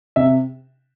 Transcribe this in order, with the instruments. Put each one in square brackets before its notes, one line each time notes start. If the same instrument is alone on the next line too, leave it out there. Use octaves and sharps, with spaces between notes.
[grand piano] C3 E5